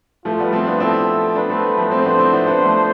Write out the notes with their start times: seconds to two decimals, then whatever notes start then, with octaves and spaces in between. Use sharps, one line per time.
0.25 F3 A3 F4
0.39 G3 B3
0.52 A3 C4
0.67 B3 D4
0.80 C4 E4 A4
1.35 B3 D4 B4
1.50 A3 C4
1.77 F3 A3
1.91 A3 C4 C5
2.05 B3 D4
2.19 C4 E4
2.33 B3 D4
2.46 B3 D4
2.65 F3 A3